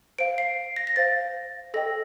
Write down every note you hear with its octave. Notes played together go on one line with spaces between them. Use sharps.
C5 F5 D7
C7
A#6
A#6
C5 F5 A6
A4 D#5 G5 A#6